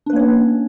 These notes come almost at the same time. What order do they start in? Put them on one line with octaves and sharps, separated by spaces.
D4 B4 A#3 C#5 C#4